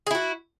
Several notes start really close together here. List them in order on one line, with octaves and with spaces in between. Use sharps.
G#4 E4 F#4